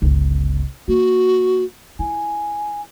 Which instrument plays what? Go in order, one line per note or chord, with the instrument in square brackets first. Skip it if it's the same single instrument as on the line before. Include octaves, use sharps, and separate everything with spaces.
[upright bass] G1 C#2
[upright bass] A#3 [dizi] F#4
[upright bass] E4 [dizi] G#5